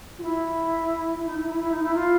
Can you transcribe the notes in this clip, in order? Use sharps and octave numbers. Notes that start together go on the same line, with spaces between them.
F4
E4
E4
D#4
E4
E4
E4
D#4
E4
F4